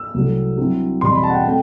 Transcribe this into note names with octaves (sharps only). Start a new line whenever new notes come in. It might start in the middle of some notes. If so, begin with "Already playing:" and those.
Already playing: E6
C2 C3 F#3 A3
G2 F#3 C4 E4
E2 B2 G3 C4 C6
B5
A5
F#5
G5
A3 C4 G5